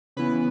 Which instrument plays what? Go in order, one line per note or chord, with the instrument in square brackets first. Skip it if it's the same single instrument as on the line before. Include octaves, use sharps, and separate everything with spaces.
[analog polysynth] C#3 E3 B3 B4